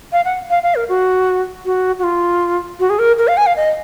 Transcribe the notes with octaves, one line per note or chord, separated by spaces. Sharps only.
F5
F#5
F5
F5
A#4
F#4
F#4
F#4
F4
F#4
G#4
A#4
A#4
F5
G#5
F5
D#5